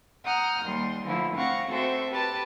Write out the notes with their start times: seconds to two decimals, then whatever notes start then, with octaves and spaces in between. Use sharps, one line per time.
0.23 F#5 A#5 D#6 F6 G6
0.61 D#2 G3 C6
1.04 D3 E3 F3 A3 E4
1.34 A3 C4 F5 F#5 C#6 A#6
1.67 C4 F#4 A4 C5 E5
2.11 G4 B4 A5 A6